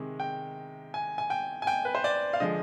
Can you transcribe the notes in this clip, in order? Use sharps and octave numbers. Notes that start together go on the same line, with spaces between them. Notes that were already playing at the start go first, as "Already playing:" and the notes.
Already playing: C3 D#3 G#3
G5
G#5
G#5
G5
G#5
G5
B4
C5
D5
F5
D3 F3 G#3 D#5